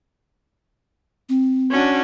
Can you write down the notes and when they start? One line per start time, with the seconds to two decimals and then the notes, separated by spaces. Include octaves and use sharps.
1.29 C4
1.70 C#4 D4 F#4